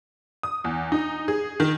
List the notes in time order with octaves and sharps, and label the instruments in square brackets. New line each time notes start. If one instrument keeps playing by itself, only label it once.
[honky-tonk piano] D#6
E2
D#4
G#4
D#3